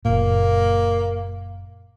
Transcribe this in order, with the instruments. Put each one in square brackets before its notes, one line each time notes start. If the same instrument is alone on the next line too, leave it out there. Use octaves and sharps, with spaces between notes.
[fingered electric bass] F#1 A#2 [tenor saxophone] A#3